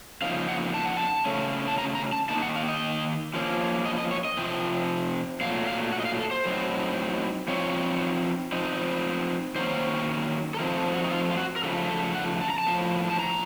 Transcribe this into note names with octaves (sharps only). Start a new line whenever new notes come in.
C#3 F3 A#3 D#4 F5
F#5
A5
F#5
A5
C#3 A3 C#4
A5
A#5
A#5
A5
D#3 A#3 D#4 A5
F#5
F5
D#5
F3 A#3 C#4
D#5
D#5
C#5
D#5
C3 F3 C4
A#2 F#3 A3 F5
F5
F#5
D#5
F5
A4
C5
A2 F#3 C4 D#4
F3 C4 D#4 C#5
F3 C4 D#4
D#3 F#3 A#3 C#4 C5
A4
F3 A3 C4 D#4 A#4
A4
F#4
D#4
F4
F4
F#4
A#4
C#3 F3 A3 A4
A4
F#5
A5
A#5
A5
A2 F3 A#3
A5
A#5